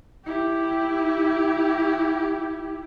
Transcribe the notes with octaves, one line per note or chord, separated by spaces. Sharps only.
E4 G4